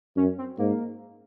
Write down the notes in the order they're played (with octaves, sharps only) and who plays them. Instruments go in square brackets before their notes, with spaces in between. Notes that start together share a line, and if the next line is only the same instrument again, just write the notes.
[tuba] F#2 [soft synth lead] C#4
[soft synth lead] C4
[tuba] G#2 [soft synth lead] A#3